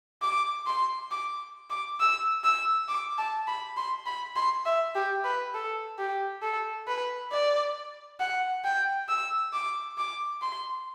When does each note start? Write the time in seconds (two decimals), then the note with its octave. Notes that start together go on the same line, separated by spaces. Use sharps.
0.22 D6
0.67 C6
1.11 D6
1.70 D6
2.00 E6
2.44 E6
2.88 D6
3.18 A5
3.47 B5
3.77 C6
4.06 B5
4.36 C6
4.66 E5
4.95 G4
5.25 B4
5.55 A4
5.99 G4
6.42 A4
6.88 B4
7.32 D5
8.20 F#5
8.65 G5
9.09 E6
9.53 D6
9.98 D6
10.42 C6